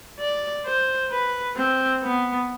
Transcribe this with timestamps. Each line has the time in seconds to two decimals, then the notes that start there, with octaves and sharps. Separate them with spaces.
0.19 D5
0.65 C5
1.11 B4
1.56 C4
2.03 B3